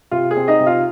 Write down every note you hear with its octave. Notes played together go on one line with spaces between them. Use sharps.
C3 F4
G#4
C4
D#4 D#5
C3
F4 F5